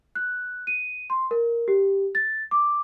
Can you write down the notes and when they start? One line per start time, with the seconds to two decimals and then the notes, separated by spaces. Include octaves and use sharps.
0.15 F#6
0.67 D#7
1.10 C6
1.31 A#4
1.68 G4
2.15 A6
2.51 D6